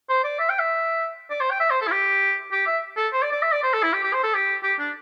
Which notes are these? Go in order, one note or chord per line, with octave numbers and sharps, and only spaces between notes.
C5
D5
E5
G5
E5
D5
C5
G5
E5
C5
A4
E4
G4
G4
E5
A4
C5
D5
D5
E5
D5
C5
A4
E4
G4
G4
C5
A4
G4
G4
D4